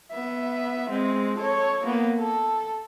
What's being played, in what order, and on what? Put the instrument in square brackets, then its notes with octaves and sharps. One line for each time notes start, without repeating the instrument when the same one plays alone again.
[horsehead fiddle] B3 E5
G#3 C4
A4 C#5
A#3 B3
A4